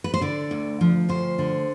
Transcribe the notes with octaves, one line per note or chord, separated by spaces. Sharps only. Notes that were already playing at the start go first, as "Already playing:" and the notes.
B4
C5
D3 D5
D2
F3
D2 C5
D3